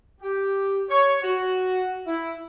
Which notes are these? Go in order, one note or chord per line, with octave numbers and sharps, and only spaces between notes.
G4
C#5
F#4
E4